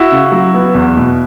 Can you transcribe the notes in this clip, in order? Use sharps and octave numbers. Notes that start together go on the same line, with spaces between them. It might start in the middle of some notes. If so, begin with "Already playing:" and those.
Already playing: E4 F#4
C#3
F#3
B3
E2
B2